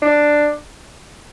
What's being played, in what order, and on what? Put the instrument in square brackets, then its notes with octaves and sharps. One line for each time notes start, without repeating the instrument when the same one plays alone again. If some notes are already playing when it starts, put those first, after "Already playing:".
[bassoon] D4